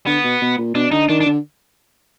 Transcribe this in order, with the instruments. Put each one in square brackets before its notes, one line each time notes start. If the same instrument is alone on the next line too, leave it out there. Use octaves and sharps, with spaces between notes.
[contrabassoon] D3 [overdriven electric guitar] B3
[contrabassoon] B2
B2
A#2
[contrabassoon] B2 [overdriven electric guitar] D4
[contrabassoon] D3 [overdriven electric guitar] D#4
[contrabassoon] D#3 [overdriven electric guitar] D4
[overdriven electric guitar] D4
[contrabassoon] D3